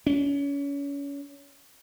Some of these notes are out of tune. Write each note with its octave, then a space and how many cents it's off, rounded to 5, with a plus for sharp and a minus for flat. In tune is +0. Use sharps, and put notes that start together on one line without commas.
C#4 +30